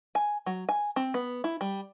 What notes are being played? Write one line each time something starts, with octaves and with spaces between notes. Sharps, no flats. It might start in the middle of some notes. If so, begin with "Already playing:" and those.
G#5
F#3
G#5
C4
B3
E4
G3